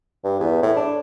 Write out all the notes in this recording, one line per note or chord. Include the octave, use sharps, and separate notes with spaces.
G2
E2
A2
D4